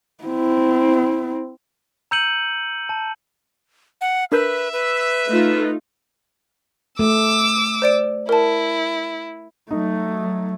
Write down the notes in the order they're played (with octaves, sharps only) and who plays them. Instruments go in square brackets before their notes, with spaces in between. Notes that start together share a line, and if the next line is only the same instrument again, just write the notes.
[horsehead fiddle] C4 E4
[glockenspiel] A#5 E6 G6 C#7 D#7 F#7
A5
[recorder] F#5
[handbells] D4 A#4 G6 [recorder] B4 [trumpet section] E5
[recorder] B4
[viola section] A3 D#4 F4
[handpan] A3 [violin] D6 E6
[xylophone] C5 D5 D7
[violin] E4 [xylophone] A#4 A5
[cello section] F#3 [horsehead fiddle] A3 [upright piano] D#4